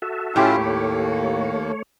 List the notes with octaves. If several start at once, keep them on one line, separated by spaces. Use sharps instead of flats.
F#4 A4 E5
A2 C#4 E4 F4 G4
D#2 A3 A#3 C#5